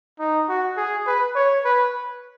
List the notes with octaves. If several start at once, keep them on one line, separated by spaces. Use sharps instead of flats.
D#4
F#4
G#4
B4
C#5
B4